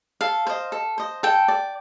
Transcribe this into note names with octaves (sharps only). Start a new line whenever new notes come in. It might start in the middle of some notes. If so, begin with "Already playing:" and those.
A4 F5
C5 D#5
A4
C5 D#5
A4 G5
D5